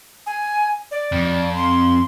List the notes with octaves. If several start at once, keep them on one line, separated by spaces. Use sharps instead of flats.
G#5
D5
F2
C6